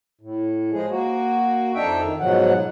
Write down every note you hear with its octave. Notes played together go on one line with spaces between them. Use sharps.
A2
F3 G#3 G#4
A#3 F#4
F2 D4 D#4 E5 G5
D#3
G#2 B2 F3 F#3 F#5